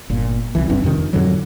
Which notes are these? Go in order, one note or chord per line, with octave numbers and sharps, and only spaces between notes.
G1 A#2
C2 E3
F#1 G2 C4 D4
F2 C3 D#3
F2 G#2 D3 F#3